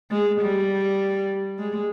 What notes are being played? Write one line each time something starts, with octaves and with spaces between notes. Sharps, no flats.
G#3
G3
G#3